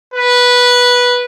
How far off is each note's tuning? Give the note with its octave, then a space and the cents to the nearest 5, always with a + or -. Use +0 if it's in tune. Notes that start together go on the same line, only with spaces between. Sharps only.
B4 -10